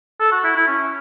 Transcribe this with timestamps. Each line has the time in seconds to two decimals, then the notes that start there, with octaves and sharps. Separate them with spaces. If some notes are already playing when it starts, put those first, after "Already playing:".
0.20 A4
0.32 F#4
0.44 E4
0.56 E4
0.67 C#4